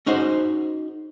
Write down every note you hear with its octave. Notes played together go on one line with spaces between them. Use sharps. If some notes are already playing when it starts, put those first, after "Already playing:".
C#4 D#4 F#4 G#4 C5